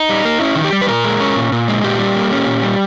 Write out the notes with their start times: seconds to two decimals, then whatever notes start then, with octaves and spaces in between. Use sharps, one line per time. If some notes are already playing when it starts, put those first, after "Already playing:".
Already playing: D#4
0.09 G3
0.25 A#3
0.40 C#4 E4
0.56 D#3
0.64 G4
0.73 G3
0.81 B4
0.88 A#2 A#4
1.04 G#3
1.20 C#4
1.36 A#2
1.52 A#2
1.68 G#3
1.84 A#2 G4
1.99 G3
2.15 A#3
2.31 C#4
2.46 A#2
2.63 G3